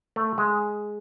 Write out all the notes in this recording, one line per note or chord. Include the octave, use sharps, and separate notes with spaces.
A3
G#3